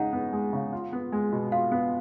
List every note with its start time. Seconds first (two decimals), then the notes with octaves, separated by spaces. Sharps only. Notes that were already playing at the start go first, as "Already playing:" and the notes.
Already playing: C#3 G#3 D#4 F#5
0.13 B3
0.33 G#3
0.53 C#3
0.73 F4
0.93 B3
1.12 G#3
1.32 B2
1.52 F4 F5
1.72 B3